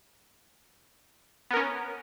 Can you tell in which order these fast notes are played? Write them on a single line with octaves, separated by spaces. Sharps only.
B3 A#4 C#4